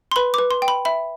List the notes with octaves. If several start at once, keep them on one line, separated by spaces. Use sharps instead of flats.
C6
B4 B5
B4 D6
C6
G5
B5
E5 B5